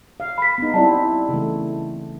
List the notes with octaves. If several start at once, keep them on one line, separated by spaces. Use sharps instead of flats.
F5
B5 B6
B3 D#4
G3 C4 E4 D5 A5
C#3 E3 A3